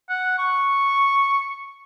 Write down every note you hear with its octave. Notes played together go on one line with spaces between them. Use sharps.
F#5
C#6